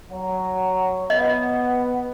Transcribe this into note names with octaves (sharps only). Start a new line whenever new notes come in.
F#3
B3 D#5